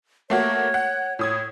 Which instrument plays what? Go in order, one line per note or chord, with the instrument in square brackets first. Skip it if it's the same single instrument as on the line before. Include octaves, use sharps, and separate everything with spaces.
[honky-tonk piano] A3 A#3 F#4 [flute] C#5
[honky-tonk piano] F#5
[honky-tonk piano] A2 D#6 G#6 [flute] C#5